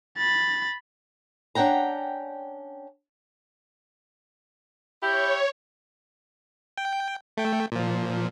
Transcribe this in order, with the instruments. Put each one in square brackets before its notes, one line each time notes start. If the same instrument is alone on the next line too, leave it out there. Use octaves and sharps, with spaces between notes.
[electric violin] B5 A6
[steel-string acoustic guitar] C#4 D4 F#5 G5 A#5
[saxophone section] E4 G4 [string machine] C#5 [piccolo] G6
[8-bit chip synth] G5
A3 G5
A#2 F3